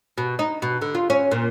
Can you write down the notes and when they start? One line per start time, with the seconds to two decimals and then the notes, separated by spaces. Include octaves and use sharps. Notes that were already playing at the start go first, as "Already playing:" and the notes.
0.18 B2
0.39 D#4
0.62 B2
0.82 D3
0.95 F4
1.10 C#4
1.31 A#2